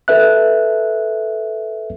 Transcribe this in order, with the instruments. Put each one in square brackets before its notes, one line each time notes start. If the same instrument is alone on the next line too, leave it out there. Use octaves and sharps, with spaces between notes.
[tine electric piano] A4 B4 E5 F#6